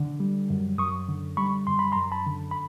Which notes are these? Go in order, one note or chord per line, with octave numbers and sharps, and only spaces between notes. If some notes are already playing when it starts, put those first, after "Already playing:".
Already playing: D3
G3
F#2
F#2 C#6 D#6
D3
G3 B5 C#6
F#2 C6
B5
A#5 C6
F#2
A5 B5
D3
B5